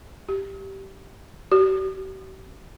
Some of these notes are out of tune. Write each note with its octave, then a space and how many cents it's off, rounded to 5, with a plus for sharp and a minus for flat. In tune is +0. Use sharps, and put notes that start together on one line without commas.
G4 -20
G4 -45